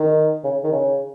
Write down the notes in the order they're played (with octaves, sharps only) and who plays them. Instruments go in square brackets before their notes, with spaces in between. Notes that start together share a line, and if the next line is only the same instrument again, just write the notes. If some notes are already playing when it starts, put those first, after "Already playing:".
Already playing: [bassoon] D#3
C#3
D#3
C#3